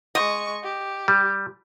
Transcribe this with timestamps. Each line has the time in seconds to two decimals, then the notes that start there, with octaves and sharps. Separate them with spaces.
0.15 G#3 D#5 C#6
0.63 G4
1.08 G3